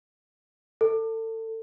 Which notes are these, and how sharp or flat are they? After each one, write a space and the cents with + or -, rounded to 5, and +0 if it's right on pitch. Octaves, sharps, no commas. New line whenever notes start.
A4 +30